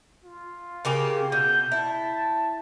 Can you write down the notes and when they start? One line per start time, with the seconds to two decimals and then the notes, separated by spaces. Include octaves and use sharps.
0.24 F4
0.85 C#3 A#3 G4
1.32 B2 G6
1.72 E4 A5